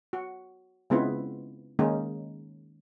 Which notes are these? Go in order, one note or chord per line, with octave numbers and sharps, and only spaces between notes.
F#4
C#3 G#3 B3 C4 E4 F4
D#3 G#3 A#3 C#4 D#4